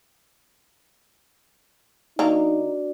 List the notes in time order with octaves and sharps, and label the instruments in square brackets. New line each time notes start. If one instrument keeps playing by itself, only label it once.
[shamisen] D#3 A#3 A#5 [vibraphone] D4 F#4 D5 [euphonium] D#4